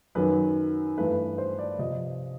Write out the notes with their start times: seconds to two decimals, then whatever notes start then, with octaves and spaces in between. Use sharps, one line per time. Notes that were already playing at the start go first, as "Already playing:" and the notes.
0.15 F#2 D#3 F#3 B4
0.97 G2 E3 A3 B4
1.38 C5
1.59 D5
1.79 C3 F3 D#5